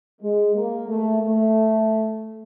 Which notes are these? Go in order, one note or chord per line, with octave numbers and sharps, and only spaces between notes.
G#3
A#3
A3
A3